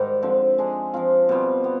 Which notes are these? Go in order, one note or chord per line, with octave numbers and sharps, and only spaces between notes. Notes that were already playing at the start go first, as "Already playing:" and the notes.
Already playing: G#2 D#3 G3
D3 F3 C4
G#3 D4 G#4
F3 C4 F4
B2 G3 C4
B3